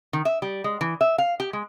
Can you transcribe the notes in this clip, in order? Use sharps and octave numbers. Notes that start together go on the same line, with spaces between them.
D#3
E5
G3
G#3
E3
E5
F5
G4
G#3